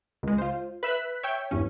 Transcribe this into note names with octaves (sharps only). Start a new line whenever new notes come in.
C#2 G#3
F4 C5
B4 E5 F#6 B6
C#5 E5 G5
E2 G2 C#4